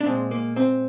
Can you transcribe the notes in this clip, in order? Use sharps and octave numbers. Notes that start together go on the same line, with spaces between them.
D4
A#2 G#3 C4
A#3
C4